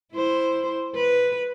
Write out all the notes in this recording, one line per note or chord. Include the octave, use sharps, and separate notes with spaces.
E4 C5
B4